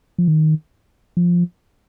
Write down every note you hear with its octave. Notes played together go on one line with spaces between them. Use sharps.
F3
D#3
F3